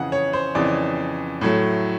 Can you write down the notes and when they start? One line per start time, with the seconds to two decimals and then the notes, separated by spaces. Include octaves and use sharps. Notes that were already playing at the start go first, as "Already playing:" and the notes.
Already playing: F2 C#3 E3 F#5
0.12 C#5
0.33 C5
0.55 F2 C#3 E3 D5
1.41 A2 F#3 A3